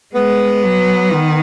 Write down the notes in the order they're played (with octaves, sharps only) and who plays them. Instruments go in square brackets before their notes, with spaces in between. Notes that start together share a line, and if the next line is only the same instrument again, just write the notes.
[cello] G#3 [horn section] B3
[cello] F#3
D#3